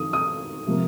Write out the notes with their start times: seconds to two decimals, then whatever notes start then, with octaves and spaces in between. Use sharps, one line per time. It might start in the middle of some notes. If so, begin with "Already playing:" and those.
Already playing: F2 D#3 F#3 D#6
0.13 D#6
0.67 C3 F3 A#3